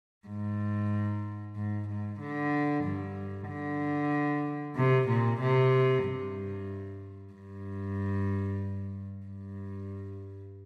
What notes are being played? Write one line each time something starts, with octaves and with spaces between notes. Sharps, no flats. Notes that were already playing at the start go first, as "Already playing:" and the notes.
G#2
G#2
G#2
D3
G2
D3
C3
A#2
C3
G2
G2
G2